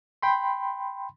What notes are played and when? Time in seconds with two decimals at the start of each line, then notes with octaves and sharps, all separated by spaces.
0.22 G5 B5 C6